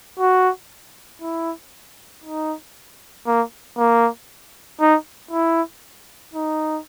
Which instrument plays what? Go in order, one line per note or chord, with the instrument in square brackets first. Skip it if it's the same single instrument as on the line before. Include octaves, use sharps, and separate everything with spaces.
[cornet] F#4
E4
D#4
A#3
A#3
D#4
E4
D#4